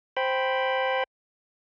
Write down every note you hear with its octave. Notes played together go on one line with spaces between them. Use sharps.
C5 G5 B5